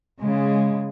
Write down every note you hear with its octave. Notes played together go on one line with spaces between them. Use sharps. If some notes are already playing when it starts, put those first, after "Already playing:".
C#3 G#3